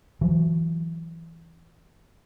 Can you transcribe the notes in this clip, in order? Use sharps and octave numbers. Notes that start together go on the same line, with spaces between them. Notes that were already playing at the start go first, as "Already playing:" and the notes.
E3 F#3